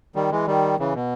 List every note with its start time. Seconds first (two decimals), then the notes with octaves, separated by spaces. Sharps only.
0.16 D#3 G3
0.31 E3 G#3
0.47 D#3 G3
0.79 C#3 E3
0.94 B2